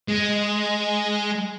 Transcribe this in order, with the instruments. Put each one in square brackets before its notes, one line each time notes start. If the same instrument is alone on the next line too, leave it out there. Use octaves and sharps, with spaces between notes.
[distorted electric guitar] G#3